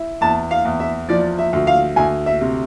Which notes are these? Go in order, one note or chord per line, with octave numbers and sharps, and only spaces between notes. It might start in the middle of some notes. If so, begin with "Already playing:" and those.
Already playing: E4
E2 A5
F5
E2
E5
F3 D5
E5
D2
F5
D2 G#5
E5
C3